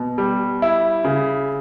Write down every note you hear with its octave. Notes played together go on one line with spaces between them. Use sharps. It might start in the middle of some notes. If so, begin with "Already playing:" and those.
Already playing: B2
G3
E4
C#3